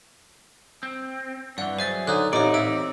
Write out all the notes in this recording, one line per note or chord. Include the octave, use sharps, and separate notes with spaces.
C4
G2 E3 D5 F#5
F#3 G#4 C5 E5 A6
D3 D#4 C#5 F#6
A1 C4 D#4 C#5 D5 D6
E4 D7